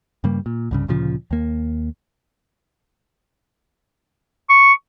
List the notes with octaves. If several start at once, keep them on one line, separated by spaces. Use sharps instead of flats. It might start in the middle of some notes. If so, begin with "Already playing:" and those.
G2 C#3 G3 A#3
A#2
C2 G2 C#3
D2 A#2 C#3 F3
D#2 A#3
C#6